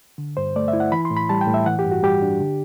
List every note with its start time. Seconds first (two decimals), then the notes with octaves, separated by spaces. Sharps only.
0.18 D3
0.37 G2 C5
0.56 A3 D5
0.68 E5
0.73 E4
0.80 F#5
0.92 E3 B5
1.05 C6
1.11 A2
1.17 B5
1.29 G3 A5
1.41 G5
1.47 A2
1.54 E5
1.66 E3 F#5
1.79 G4
1.85 G2
1.91 F#4
2.03 G3 G4
2.22 D4
2.40 D3